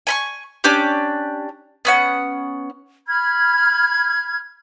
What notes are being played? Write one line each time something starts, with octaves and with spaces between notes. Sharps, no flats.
G#5 B5 C#6
C#4 D4 G4 D6
B3 C#4 F#5
B5 F6 G#6